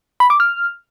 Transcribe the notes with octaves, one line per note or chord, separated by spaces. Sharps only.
B5
D6
F6